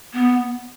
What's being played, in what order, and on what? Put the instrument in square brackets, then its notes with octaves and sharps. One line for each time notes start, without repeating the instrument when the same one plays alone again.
[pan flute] B3